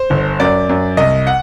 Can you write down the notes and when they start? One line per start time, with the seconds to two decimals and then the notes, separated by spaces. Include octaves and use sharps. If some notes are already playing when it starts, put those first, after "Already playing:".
Already playing: C5
0.10 G1
0.40 F#2 D5
0.69 F#2
0.97 C2 D#5
1.27 F#5